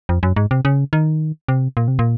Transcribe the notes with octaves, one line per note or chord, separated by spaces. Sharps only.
F2
F#2
G#2
C3
C#3
D#3
C3
A#2
C3
A#2